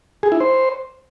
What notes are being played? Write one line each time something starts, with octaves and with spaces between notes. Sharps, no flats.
G#4
E4
C5